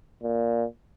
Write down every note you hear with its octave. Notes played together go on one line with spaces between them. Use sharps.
A#2